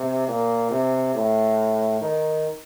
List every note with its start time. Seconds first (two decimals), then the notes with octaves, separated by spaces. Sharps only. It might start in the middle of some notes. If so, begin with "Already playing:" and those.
Already playing: C3
0.28 A#2
0.71 C3
1.15 A2
2.01 D#3